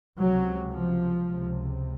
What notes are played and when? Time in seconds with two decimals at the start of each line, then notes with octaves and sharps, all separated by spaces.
0.19 C#2 C3 F#3
0.71 F3
1.24 C#2 C3